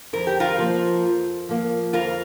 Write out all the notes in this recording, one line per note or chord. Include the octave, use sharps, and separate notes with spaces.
F2 A#4
G4
F4 A#4
F3 A#3
F2
F3 A#3
F2 F4 A#4